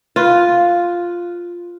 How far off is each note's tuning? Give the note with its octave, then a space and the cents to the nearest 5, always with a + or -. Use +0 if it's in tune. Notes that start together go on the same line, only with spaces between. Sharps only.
F4 +0 B4 +0